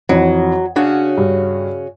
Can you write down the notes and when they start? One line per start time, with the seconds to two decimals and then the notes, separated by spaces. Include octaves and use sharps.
0.09 F2 E3 F#3
0.76 C#3 C#4 D4 F#4
1.17 G2